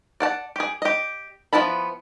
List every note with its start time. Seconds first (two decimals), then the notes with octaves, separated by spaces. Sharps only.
0.20 D5 F#5 A5
0.56 G4 G#4
0.82 G4 D#5
1.53 F3 B3 E4 A5 B5